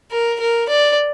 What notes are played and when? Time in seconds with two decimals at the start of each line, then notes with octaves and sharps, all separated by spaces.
0.11 A#4
0.40 A#4
0.69 D5